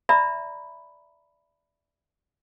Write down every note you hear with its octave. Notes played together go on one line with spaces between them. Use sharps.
D5 E5 A#5 B5